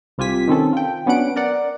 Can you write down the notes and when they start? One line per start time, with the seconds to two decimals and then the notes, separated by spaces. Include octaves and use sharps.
0.18 C2 C3 F4 G4 G#5 B6
0.48 D#3 C4 C#4 A4
0.73 F4 G5
1.06 F#3 B3 C#4 D4 F#5 D7
1.36 A#4 D5 F#5